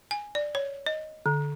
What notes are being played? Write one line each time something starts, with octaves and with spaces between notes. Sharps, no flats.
G#5
D5
C#5
D#5
D3